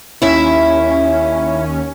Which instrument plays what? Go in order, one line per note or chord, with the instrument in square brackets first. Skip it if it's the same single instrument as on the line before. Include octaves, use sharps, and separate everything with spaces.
[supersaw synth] D#2 C#4 [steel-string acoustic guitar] E4 E5